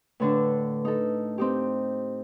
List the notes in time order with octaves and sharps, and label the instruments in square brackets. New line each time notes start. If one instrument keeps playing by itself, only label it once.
[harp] A2 D3 D4 [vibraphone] B4
[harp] D#4 A4
C4 D#4 G4